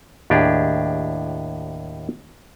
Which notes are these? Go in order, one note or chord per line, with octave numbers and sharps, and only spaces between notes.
D#2 A2 D4 G4 G#4